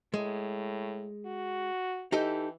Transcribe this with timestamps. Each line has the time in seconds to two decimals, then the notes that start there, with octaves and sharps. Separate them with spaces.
0.14 A2 G#3
1.26 F#4
2.12 E3 D#4 G4 A4